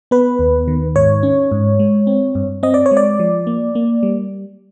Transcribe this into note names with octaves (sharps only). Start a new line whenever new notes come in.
B3 B4
D#2
D#3
G#2 C#5
C#4
G#2
G#3
C4
G2
C4 D#5
D5
C#5
G#3
D5
F3
A#3
A#3
G3